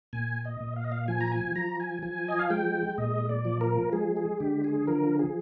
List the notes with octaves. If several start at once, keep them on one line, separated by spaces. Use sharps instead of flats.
A#2 G#5
D#5
A#2
F5
D#5
F5
F3 G#5
A#5
G#5
F3 A#5
G#5
F3 G#5
D#5
F5
G#3 G5
A#2 D#5
D5
F3
A#4
G#3 G#4
G#4
D3 G4
G#4
F3 A#4
G#4